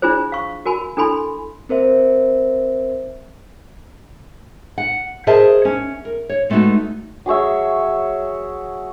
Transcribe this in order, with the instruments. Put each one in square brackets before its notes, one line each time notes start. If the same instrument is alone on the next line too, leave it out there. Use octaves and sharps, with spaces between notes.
[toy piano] D4 E4 F4 G#4 C5
F5 C#6
F#4 A#4 G#5 B5
D4 E4 A4 G#5 B5 C6
[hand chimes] C4 A#4 C5 E5
[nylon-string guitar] F#5
G#4 A#4 C5 D#5 E5 A5
C#4
A#4
C#5
G#3 A3 B3 D4 D#4 F#4
[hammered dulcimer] F#3 G#4 C#5 E5